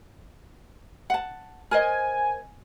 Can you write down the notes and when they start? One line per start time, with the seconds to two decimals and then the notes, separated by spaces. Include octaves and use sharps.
1.10 F#5 A5
1.71 A#4 C5 D#5 G#5